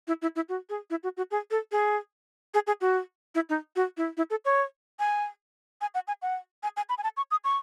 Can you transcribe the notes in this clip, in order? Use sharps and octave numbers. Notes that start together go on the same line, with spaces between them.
E4
E4
E4
F#4
G#4
E4
F#4
F#4
G#4
A4
G#4
G#4
G#4
F#4
E4
D#4
F#4
E4
E4
A4
C#5
G#5
G#5
F#5
G#5
F#5
G#5
G#5
B5
G#5
A5
C#6
D#6
C#6